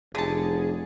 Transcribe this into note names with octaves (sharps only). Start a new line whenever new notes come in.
F1 D3 G#4 A5